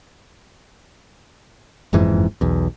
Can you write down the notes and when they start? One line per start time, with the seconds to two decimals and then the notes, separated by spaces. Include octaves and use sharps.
1.93 F#1 F2 G#2 E3
2.41 B1 E2